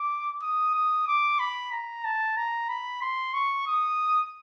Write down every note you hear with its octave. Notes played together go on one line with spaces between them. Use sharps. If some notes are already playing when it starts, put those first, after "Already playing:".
Already playing: D6
D#6
D#6
D6
B5
A#5
A5
A#5
B5
C6
C#6
D#6